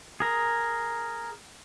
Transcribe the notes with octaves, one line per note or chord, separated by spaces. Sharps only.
G#4 A#4